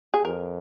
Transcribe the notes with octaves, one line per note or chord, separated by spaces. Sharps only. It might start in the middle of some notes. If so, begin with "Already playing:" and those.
G#4
F2 A#4